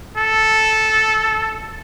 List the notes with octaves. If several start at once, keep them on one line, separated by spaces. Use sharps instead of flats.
A4